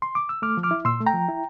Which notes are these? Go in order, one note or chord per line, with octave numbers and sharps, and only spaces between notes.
C6
D6
E6
A3 D6 F6
F3
D6 F6
E4
A#2 C6 E6
A3
G5 A#5
F3
E4